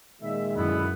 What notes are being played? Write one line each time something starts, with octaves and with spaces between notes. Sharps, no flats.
A#2 D#3 G#3 E5
F#2 D3 B3 E4